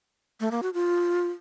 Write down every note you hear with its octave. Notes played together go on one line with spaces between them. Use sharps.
A3
A#3
F#4
F4